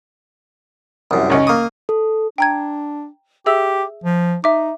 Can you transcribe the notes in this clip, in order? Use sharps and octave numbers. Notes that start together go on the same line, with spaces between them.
C2 F#2
C#2 C#4 D#4
A#3 C#6 D#6
A4
D4 G5 A#5 G#6
G4 G#4 E5 E6
F3
D#4 E5 D6